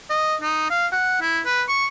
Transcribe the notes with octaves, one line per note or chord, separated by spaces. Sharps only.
D#5
D#4
F5
F#5
E4
B4
C#6